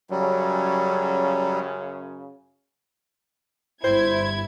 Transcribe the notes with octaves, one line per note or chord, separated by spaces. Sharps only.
F#2 C#3 F#3 G3
G1 E4 C5 G#6